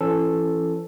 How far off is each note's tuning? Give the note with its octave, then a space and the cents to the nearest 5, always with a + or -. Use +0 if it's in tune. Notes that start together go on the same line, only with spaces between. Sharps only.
E3 +35 C#4 +0 A4 +0